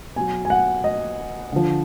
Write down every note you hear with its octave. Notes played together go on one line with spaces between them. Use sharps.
B2 F#3 G#5
G#5
F#5
D#5
D3 F3